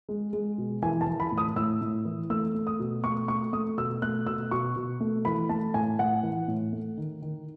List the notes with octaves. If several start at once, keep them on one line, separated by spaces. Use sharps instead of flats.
G#3
G#3
B2
E3 G#5
A5
E3
B5
A2
D#6
A2 E6
A2
E3
A3 E6
A3
D#6
B2
A3 C#6
A3 C#6
A3 D#6
B2 E6
A3 F#6
B2 E6
B2 C#6
B2
A3
E3 B5
A3 A5
A2 G#5
A2 F#5
E3
A2
A3
D#3
D#3